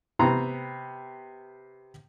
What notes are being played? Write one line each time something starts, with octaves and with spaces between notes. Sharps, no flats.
C3 B3 A#5 C6